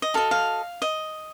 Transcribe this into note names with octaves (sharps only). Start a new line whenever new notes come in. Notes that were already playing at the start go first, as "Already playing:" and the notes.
D#5
F#4 A4 D#5 F5
F5
D#5